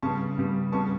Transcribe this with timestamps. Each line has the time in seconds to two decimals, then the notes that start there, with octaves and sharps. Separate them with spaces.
0.03 C#3 G3 B3 A5 C#6
0.38 C#3 G3 B3
0.72 C#3 G3 B3 A5 C#6